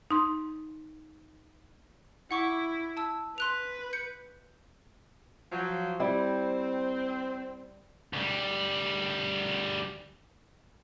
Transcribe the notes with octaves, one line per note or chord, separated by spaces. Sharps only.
D#4 C6
E4 F#5 C#6 D6
A5 E6
B4 C6 F#6 F7
G6 C#7
F3 F#3
G3 C4 E4
D2 G3